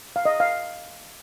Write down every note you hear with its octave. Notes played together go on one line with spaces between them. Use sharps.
F5
D#5
F5